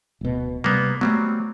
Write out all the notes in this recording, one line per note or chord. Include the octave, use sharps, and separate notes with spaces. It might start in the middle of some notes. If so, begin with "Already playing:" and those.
D1 B2
C3 G3 A#3 B3
F#3 G3 A3 B3 C4